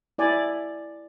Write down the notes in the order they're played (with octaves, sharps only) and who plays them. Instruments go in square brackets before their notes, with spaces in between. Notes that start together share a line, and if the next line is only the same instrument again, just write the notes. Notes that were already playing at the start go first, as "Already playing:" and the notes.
[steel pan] E4 D5 G#5